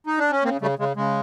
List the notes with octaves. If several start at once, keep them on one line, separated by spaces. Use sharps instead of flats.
D#4
D4
C#4
C#3 A#3 C4
C#3 G3 A3
C#3 G#3
C#3 G#3